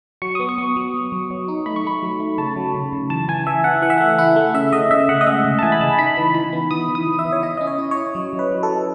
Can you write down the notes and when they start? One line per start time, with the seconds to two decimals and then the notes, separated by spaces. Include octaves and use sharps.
0.22 F#3 C#6
0.35 B3 D#6
0.49 C#6
0.58 B3
0.76 F#3
0.94 B3
1.12 F#3
1.30 F#3
1.48 D#4
1.66 A3 B5
1.76 C#6
1.84 A3 B5
2.03 F#3
2.20 A3
2.38 C#3 A5
2.56 F#3
2.75 C#3
2.93 C#3
3.10 E3 A5
3.28 E3 G#5
3.47 E3 E5
3.64 E3 F#5
3.82 E3 F#5
3.90 E5
3.98 A3 F#5
4.18 E4 F#5
4.36 A3
4.54 C#3 E5
4.72 C#3 D#5
4.91 C#3 E5
5.09 C#3 F#5
5.21 D#5
5.26 G#3 E5
5.45 C#3
5.59 A5
5.63 E3 G#5
5.72 B5
5.80 C#3 A5
5.99 D#4 B5
6.17 E3
6.35 E3 B5
6.53 B3
6.71 E3 D#6
6.89 E3
6.95 D#6
7.07 E3
7.19 E5
7.25 E3
7.32 C#5
7.43 E4 D#5
7.57 C#4 D#5
7.67 C#5
7.78 E4
7.91 C#5
7.97 E4
8.15 F#3
8.33 F#3
8.39 B4
8.51 F#3
8.63 A4
8.69 F#3